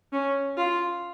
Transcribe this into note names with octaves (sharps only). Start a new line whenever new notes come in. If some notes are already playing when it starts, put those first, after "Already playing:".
C#4
F4